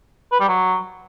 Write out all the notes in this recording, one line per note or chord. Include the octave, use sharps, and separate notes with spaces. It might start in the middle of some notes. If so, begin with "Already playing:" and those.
B4
G3
F#3